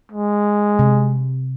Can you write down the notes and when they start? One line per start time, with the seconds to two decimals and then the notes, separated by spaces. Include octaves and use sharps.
0.12 G#3
0.79 C3